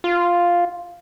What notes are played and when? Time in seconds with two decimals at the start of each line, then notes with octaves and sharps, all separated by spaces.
0.04 F4